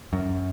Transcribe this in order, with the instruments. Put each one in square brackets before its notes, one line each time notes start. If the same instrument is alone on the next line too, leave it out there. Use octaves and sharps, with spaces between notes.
[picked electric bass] F#2